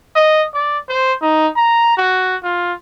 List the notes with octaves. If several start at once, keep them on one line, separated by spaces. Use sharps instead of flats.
D#5
D5
C5
D#4
A#5
F#4
F4